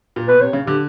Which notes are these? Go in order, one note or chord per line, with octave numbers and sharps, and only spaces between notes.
A#2
B2 B4
C3 C#5
C#3
D3 G4